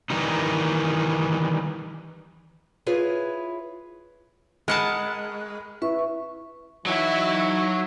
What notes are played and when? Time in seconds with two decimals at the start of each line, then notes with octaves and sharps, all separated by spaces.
0.10 D#3 E3 G3 D#4
2.86 E4 F4 G#4 B4 C#5
4.68 G#3 A#4 F#5 A5 B5 F6
5.82 E4 B4 E5 C#6
6.86 E3 F#3 D#4 E4 F#4 C#5 E5